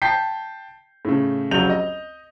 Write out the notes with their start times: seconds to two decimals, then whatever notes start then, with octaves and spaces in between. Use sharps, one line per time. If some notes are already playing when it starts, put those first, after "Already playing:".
0.02 G5 A5 G6 B6 C7
1.05 A2 C#3
1.51 F1 C#2 F#3 G6 F7
1.70 D#5